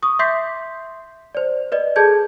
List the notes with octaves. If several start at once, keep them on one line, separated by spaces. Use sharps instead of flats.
C#6 D#6
E5 C6 D6 G6 B6 C7
C5 D5
B4 D5 D#5
G#4 A4 A5 G6 G#6